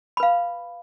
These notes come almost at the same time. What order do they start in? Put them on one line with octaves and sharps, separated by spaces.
B5 B4 F5